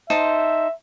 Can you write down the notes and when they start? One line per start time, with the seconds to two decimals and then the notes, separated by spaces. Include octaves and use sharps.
0.10 D#4 C5 E5 A5